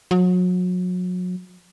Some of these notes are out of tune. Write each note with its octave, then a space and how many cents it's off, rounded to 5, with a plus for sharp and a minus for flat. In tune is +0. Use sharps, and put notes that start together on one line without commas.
F#3 -35